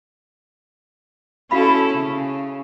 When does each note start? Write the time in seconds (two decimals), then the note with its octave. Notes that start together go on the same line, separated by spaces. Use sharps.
1.51 C#4 E4 F#4 A4 F5 B5
1.94 C#3